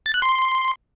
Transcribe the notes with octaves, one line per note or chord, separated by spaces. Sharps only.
A6
F#6
C6